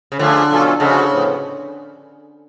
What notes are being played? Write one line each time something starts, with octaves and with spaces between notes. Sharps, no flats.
C#3
D3 F3 A3 F4 G#4
B2 F#3 C#4 F4 A4
C#3 F3 G#3 C#4 F#4 A4
A2 F3 B3